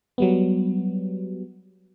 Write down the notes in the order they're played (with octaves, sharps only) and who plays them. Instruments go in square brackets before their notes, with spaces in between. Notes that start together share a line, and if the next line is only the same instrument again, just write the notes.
[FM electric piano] F#3 G3 B3